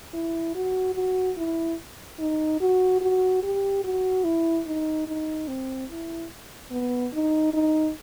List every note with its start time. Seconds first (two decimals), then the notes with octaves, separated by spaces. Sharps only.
0.14 E4
0.55 F#4
0.95 F#4
1.37 E4
2.19 D#4
2.61 F#4
3.01 F#4
3.43 G4
3.84 F#4
4.24 E4
4.67 D#4
5.08 D#4
5.48 C4
5.90 E4
6.71 B3
7.14 D#4
7.53 D#4